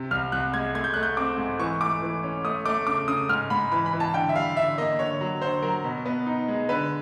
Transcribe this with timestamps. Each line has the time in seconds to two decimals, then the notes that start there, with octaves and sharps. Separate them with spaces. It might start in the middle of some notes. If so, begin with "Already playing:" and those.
Already playing: C3
0.11 C2 F6
0.32 C2 F#6
0.54 G#3 G#6
0.74 A3 G#6
0.84 G6
0.94 A3 F#6
1.03 G6
1.17 C4 D6
1.38 G#2
1.59 E3 C#6
1.81 A3 D6
2.02 E3
2.23 C#4
2.44 A3 D#6
2.65 A3 D6
2.87 C#3 D6
3.08 C#3 D#6
3.29 G#2 F6
3.50 G#2 B5
3.72 E3 B5
3.86 B5
3.93 E3
4.00 A5
4.14 D3 G5
4.29 E5
4.35 G3 F5
4.57 D3 E5
4.78 A#3 D#5
4.99 D3 C#5
5.21 F#3
5.42 D3 C5
5.63 F#3 A#4
5.84 B2
6.05 B3
6.26 D#4
6.48 G#3
6.69 D3 B4